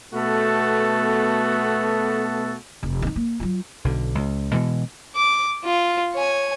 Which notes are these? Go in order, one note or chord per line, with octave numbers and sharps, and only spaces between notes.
B2 A3 B3 F#4 A4
F1
C3 D#4
A#3
F#3 F4
B1 D3
C#2
B2 E3 G#3
D6
F4
C#5 G#5